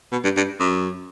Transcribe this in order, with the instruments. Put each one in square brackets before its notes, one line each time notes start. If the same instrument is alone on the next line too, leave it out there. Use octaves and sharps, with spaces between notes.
[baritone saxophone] B2
G2
G2
F#2